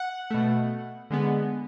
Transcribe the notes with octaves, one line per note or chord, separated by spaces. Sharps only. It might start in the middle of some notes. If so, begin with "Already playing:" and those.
Already playing: F#5
B2 A3
D3 G#3 B3